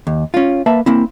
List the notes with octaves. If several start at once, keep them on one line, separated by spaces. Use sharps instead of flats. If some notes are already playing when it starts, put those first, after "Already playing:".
D#2
C#4 F4
A#3 B4 E5 A5
A#3 C4 E4